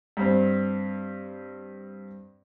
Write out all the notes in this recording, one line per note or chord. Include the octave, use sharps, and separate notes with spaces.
G2 C4